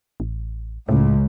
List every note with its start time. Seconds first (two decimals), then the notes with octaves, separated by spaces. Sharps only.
0.20 A1
0.89 C#2 A2